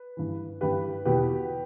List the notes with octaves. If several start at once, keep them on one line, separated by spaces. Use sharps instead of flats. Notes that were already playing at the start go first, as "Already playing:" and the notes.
Already playing: B4
G2 E3
G2 E3 G4 B4
E2 B2 G4 B4